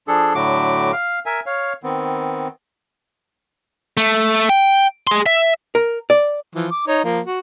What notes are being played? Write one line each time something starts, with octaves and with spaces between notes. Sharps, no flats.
F3 D4 G#4 A4
A2 D3 F#3 A3 F#4 D6
F5
A#4 E5 G#5
C#5 F5
D#3 B3 C4
A3
G5
G#4 C6
E5
A#4
D5
E3 F3
D6
D#4 C#5
F3 A#3
F#4